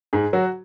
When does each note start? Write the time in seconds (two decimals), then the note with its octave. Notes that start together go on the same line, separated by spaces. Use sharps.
0.13 G#2 G#4
0.33 F#3 F#4